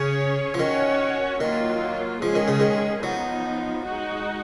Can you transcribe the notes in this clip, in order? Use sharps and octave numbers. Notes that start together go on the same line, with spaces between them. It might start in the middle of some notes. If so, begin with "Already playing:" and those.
Already playing: C#3 C#4 G#4 C#5
F3
D#3 C#4 F#4 C#5
D#3 F#3 A#3 F4
F3 G#3 C#4 G#4
D#3
C#3
D#3
F3 F#3 B3 D#4
G#3 D#4 F#4